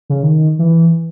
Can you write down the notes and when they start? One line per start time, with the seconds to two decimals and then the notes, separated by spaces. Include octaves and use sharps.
0.10 C#3
0.23 D#3
0.59 E3